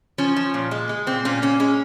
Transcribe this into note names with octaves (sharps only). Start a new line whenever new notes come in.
F3 C#4
F3
A#2
G#3
G#3
A#2 C4
A#2 C#4
A#2 C#4
G#3 C#4